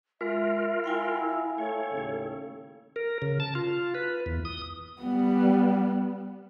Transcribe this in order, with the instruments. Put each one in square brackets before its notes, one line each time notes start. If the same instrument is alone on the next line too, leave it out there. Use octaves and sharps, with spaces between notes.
[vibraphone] G#3 [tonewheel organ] F4 A#4 [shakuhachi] E5
[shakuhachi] E4 [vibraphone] F5 G5 G#5
[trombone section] A3 [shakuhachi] A4 [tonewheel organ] C#5
[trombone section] D#2 A2 C#3
[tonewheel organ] A#4
C#3
A5
F4
B4
E2
D#6
[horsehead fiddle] G3 B3